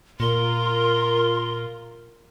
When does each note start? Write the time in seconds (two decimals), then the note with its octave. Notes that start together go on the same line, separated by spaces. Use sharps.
0.20 A#2 F4 A#4 C6